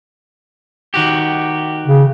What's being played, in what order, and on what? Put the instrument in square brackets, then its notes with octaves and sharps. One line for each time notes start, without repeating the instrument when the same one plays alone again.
[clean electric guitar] D#3 F#4 G4
[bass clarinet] C#3